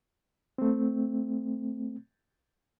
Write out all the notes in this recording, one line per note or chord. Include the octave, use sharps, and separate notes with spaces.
A3 C4